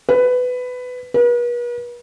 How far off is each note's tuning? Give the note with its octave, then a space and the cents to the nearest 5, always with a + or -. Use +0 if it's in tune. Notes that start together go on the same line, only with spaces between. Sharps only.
B4 +15
B4 -45